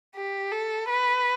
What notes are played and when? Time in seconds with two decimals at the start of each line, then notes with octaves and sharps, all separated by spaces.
0.15 G4
0.52 A4
0.90 B4